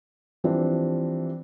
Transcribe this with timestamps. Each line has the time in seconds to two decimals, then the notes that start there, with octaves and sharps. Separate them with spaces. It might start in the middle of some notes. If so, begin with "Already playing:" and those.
0.44 E3 F3 G3 C4 D4